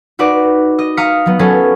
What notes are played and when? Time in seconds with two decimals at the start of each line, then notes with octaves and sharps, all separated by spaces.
0.19 D#4 F#4 B4 D5
0.79 D#5
0.97 F5 A#5 D#6 A#6 B6 C#7
1.26 F#3 B3
1.39 F#3 C#4 G#4 A4 B4